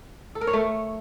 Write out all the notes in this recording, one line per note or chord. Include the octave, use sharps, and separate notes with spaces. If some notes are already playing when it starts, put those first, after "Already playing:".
A4
A#4
C#5
A3